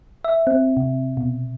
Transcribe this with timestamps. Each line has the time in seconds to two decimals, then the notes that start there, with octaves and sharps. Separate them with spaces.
0.24 E5
0.47 C4
0.77 C3
1.17 B2